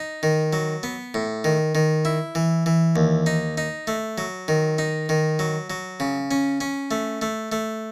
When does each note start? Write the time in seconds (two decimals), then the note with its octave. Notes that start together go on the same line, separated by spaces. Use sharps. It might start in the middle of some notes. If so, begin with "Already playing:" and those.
Already playing: D#4
0.23 D#3
0.53 F#3
0.83 B3
1.14 A2
1.44 D#3
1.75 D#3
2.05 E4
2.35 E3
2.66 E3
2.96 D#2
3.26 D#4
3.58 D#4
3.87 A3
4.18 F#3
4.48 D#3
4.78 D#4
5.09 D#3
5.39 F#3
5.70 F#3
6.00 C#3
6.31 C#4
6.61 C#4
6.91 A3
7.22 A3
7.52 A3